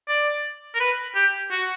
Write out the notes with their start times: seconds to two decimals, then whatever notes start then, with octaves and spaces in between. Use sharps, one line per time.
0.08 D5
0.74 A#4
0.80 B4
1.15 G4
1.51 F#4